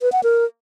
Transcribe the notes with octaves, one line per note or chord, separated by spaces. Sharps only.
B4
F#5
A#4